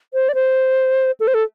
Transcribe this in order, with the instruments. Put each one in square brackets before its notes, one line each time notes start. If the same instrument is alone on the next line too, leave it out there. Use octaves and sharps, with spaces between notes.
[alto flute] C5
D5
C5
A4
C5
A4